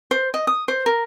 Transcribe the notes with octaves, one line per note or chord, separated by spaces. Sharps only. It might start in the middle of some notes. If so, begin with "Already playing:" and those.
C5
D#5
D#6
C5
A#4